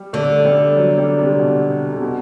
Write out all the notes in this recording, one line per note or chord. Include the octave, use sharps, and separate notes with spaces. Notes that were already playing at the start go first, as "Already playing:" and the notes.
Already playing: G3
D3 A3
G3
F#3
G3
C3
B2
C3
B2